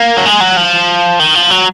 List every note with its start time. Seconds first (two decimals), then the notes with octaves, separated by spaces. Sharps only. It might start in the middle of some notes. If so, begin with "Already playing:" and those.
Already playing: A#3
0.17 F#3
0.25 G#3
0.40 F#3
0.57 F3
1.20 D#3
1.35 F3
1.51 F#3